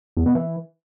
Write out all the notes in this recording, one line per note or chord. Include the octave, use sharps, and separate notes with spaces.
E2
B2
E3